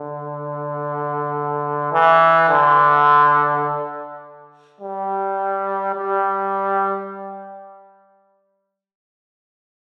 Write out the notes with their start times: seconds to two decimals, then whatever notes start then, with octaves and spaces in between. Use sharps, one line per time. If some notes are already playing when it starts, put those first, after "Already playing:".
Already playing: D3
1.92 E3
2.50 D3
4.81 G3
5.96 G3